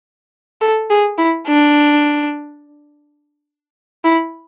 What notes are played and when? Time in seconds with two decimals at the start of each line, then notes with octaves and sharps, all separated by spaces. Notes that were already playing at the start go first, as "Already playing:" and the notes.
0.61 A4
0.90 G#4
1.18 E4
1.47 D4
4.04 E4